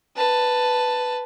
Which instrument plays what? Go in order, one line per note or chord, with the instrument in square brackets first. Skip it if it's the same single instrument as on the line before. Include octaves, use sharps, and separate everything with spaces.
[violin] B4 A5